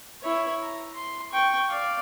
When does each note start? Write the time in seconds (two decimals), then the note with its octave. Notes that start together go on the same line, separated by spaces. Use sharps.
0.22 E4 C#5
0.63 A#5
0.95 C6
1.32 G5 C#6
1.69 D5 F5